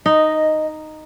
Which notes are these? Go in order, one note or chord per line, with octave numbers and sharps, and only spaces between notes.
D#4 D#5